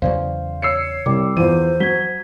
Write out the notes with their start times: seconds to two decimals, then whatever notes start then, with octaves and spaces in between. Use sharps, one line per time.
0.02 E2 C#3 F#3 C5 D5 F5
0.62 C#5 E6 C7 C#7
1.06 C2 C3 G3 D6
1.37 E2 E3 F4 C5 D#7
1.80 F#3 G#6 B6 G7